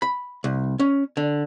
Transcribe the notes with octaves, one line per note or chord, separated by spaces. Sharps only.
B5
C2
C#4
D3